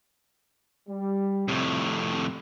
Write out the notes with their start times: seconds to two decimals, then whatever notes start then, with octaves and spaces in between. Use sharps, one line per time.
0.89 G3
1.48 F2 A2 C3